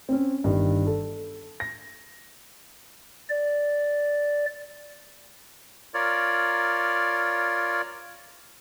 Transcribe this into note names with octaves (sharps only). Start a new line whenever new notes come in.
C4 C#4
G1 G2 D#3
A4
A#6
D5
F4 A#4 C#5 D5